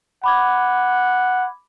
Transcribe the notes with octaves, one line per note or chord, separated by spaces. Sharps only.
F#5 B5 D6 G#6